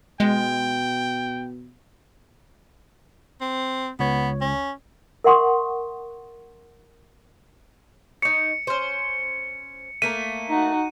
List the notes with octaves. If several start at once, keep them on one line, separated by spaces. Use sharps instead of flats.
B2 G#3 G5
C4
C#2 B3 C#5
C#4
A#4 E5 F#5 C6 C#6 D#6
D#4 C#5 C#7
C#4 C5
A3 A#3 A#4 D#7
D#4 F#4